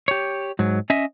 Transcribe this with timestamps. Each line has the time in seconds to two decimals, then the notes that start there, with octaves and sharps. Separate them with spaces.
0.08 G4 C#5
0.59 G#2 F#3
0.90 C#4 D#5 E5